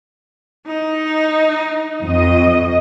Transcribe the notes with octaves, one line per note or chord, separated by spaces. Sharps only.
D#4
F2 D#5